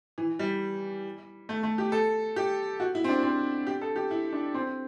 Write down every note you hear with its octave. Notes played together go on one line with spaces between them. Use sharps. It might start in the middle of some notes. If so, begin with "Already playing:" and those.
E3
G3
A3
A3
G4
A4
G4
F#4
E4
C4
D4
C4
G4
A4
G4
E4
D4
C4